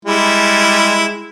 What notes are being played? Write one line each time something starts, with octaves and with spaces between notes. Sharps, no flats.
G3 G#3 E4